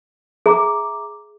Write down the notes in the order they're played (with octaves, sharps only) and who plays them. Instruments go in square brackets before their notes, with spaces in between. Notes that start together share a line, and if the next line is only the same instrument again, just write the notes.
[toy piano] G#4 [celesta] E5 A#5 D6